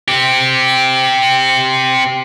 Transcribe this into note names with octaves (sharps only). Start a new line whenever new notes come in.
C4 G4